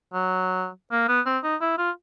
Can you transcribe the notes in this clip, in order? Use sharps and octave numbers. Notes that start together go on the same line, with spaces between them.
F#3
A#3
B3
C4
D#4
E4
F4